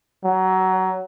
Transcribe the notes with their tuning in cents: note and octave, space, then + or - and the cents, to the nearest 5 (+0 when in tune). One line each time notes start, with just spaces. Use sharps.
F#3 +20